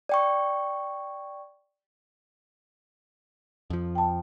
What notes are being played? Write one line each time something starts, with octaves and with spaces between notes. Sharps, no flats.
D5 G5 C#6
F2 F3
G5 A5